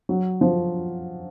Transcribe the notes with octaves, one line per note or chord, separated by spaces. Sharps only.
F#3
F3